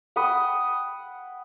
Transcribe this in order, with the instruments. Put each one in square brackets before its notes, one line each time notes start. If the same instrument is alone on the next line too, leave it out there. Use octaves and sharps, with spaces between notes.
[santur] F#5 G5 B5 D#6